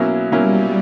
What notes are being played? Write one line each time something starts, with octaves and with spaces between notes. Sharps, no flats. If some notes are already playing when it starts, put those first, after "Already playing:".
Already playing: B2 F#3 A#3 C#4 E4
B2 F#3 G3 A#3 C#4 E4